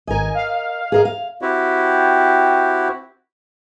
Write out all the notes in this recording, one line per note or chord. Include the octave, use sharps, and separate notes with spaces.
G#1 A#4 D#5 G#5
F5
G#4 A#4 D#5
F5
C4 E4 F#4 G4